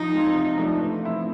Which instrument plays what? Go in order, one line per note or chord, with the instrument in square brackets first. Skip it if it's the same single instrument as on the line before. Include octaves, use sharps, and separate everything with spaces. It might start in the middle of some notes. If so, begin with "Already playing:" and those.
Already playing: [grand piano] F3 [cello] D#4
[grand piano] G#3 C4 F4
C3
F3 A3 D4
E3
A3 C4 E4